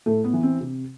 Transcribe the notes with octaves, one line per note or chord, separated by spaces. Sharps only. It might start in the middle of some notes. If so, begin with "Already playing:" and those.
A2 A3
B3
E3
C4
C3